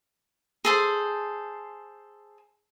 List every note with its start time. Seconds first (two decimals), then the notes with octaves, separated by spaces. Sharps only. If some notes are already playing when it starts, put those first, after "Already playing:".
0.65 G#4 A4 C5